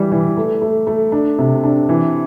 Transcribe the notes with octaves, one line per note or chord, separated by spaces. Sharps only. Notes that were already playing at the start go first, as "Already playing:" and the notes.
Already playing: E3 G3
E3
A3
A3
A3
D4
C3
D4
E3